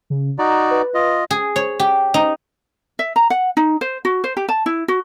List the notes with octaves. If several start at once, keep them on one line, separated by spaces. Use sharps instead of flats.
C#3
D#4 F#4 D5 A#5
B4
F4 D#5
G#4
C#5
G4
D#4
E5
A#5
F#5
D#4
C5
F#4
C5
G4
A5
E4
F#4